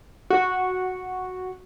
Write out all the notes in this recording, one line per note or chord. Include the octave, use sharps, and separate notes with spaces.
F#4